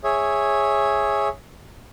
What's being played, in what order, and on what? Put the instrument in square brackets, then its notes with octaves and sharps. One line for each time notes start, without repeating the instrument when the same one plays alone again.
[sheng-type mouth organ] G#4 C#5 E5